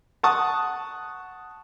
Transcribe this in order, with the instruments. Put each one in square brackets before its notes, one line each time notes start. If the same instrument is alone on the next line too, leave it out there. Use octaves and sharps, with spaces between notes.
[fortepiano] F#5 A5 C#6 D#6